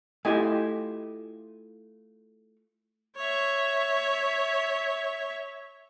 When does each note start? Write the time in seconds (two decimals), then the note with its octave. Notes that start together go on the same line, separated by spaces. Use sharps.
0.25 A3 E4 F4 G4 D#5 G#5
3.16 C#5 E5